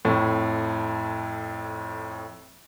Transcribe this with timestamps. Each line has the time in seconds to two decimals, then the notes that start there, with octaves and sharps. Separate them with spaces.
0.05 F2 A2